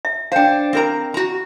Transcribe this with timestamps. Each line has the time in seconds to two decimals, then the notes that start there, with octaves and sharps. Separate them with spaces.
0.05 E5
0.32 D4 C5 F5 G5
0.73 C4 A#4 A#5
1.14 F#4 A#5